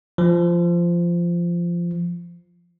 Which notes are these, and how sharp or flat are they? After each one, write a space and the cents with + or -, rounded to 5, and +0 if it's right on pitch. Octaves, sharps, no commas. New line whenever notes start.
F3 -15